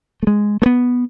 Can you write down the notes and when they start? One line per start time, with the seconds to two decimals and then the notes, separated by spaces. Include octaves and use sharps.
0.23 A3
0.27 G#3
0.62 A3
0.66 B3